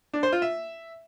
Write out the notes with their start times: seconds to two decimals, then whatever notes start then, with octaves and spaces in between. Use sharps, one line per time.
0.13 D4
0.23 C5
0.32 F4
0.42 E5